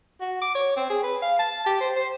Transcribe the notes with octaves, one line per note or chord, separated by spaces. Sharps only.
F#4
D6
C#5
C4
G#4
B4
F5
A5
G4
C5
C5